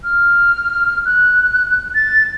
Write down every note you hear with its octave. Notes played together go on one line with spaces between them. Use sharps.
F6
F#6
A6